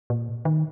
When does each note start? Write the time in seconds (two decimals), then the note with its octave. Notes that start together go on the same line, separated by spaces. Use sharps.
0.10 A#2
0.45 D#3